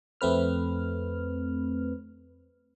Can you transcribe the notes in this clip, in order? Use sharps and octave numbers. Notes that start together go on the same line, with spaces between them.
F2 A3 C4 B4 F6